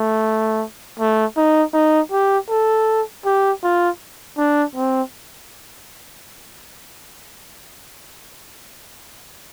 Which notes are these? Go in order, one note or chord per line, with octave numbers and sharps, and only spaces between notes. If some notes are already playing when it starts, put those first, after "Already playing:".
Already playing: A3
A3
D#4
D#4
G4
A4
G4
F4
D4
C4